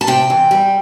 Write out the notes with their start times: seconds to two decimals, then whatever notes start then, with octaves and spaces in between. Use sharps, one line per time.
0.01 A5
0.07 C3 G5
0.30 E3
0.51 G3